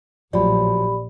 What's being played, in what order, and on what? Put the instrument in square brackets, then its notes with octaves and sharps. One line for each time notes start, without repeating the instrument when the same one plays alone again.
[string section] A#1 [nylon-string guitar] A2 F3 F#3 [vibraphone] G4 B5 [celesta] D5